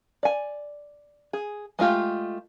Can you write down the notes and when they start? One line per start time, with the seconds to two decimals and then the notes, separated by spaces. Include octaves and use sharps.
0.23 D5 G#5
1.33 G#4
1.79 G#3 A3 F4 G4